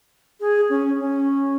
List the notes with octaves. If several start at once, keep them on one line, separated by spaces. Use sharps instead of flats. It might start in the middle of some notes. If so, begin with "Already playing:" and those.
G#4
C#4
C#4